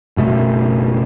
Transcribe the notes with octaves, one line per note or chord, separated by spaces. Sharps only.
F#1 B2 A3